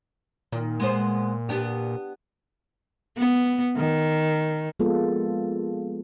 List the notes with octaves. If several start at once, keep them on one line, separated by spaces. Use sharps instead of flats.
A#2 D#3
G#3 B3 C5
B3 D4 G4
B3
D#3
F3 G#3 A#3 B3 F4 A4